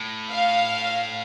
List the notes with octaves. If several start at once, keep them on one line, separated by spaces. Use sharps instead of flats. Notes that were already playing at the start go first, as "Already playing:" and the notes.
Already playing: A2
F5